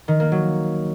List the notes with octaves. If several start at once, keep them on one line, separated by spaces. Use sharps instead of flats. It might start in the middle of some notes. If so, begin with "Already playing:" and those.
D#3
A#3
F#3